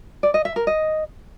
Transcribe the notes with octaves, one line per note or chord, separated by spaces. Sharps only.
D5
D#5
E5
A#4
D#5